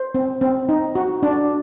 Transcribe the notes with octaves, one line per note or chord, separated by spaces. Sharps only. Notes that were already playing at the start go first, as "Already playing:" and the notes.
Already playing: C5
C4
C4
D#4
F#4
D4